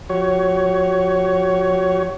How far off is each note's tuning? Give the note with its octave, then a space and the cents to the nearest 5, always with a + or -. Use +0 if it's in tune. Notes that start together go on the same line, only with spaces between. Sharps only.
F3 +30 F#4 +40 C#5 +10